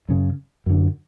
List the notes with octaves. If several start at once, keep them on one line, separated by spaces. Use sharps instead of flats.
F#2 C#3
F#2 D3